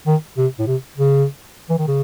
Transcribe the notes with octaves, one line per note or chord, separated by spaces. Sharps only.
D#3
C3
A2
C3
C#3
E3
D#3
C#3